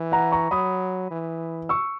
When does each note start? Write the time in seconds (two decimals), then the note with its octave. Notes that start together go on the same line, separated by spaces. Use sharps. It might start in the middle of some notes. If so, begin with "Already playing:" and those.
Already playing: E3
0.12 F#5 A#5
0.32 A#5 C#6
0.51 F#3 B5 D#6
1.11 E3
1.69 C#6 E6